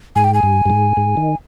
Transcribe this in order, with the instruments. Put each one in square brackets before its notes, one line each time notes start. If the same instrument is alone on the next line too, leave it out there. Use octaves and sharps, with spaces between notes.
[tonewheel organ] G#2 [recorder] G#5
[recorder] G5
G#5
[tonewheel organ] G2
G2
G#2
G#2
D#3